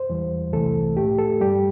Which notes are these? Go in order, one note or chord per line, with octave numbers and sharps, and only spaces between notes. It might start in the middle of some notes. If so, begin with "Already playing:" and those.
Already playing: C5
E2 E3 G3
C2 C3 E3 A3 A4
A2 A3 G4
A4
G2 G3 G4